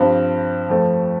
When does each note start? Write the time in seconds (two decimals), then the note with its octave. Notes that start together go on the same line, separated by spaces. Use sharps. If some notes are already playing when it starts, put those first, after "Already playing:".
Already playing: G2 F3 C4
0.69 F2 F3 A3